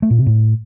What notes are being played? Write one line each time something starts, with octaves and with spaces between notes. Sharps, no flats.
A3
A#2
C3
A2